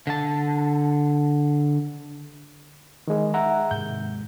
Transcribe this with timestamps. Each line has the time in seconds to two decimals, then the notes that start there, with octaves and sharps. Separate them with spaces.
0.07 D3 A5
3.07 D#3 G#3
3.34 E5 F#5 A#5
3.71 G#2 C3 D#3 G6